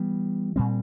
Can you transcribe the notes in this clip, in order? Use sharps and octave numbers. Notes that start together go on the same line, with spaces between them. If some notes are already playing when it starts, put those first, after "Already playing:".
Already playing: E3 G3 B3
A#2 G3 C4